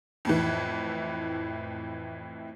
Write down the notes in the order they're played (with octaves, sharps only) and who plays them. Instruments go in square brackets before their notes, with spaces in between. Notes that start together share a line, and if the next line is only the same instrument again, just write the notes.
[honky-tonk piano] F2 A2 E3